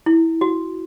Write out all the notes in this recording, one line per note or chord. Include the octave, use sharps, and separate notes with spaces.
E4
F#4